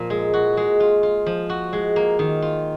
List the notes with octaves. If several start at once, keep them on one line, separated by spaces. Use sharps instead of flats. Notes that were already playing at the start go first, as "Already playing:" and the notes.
Already playing: A#2 F3 A#3
G#3
F#4
G#3
F4
F4
F3
F#4
G#3
A#3
D#3
F4